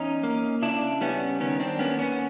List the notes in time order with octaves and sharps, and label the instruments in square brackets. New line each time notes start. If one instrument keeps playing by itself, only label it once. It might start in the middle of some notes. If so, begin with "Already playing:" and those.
Already playing: [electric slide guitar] E2 C#4 D#4
A#3
C#3 D4 E4
G3 B3 C#4
D#3 B3 C#4
C4 D4
A#3 B3 C#4
B3 C#4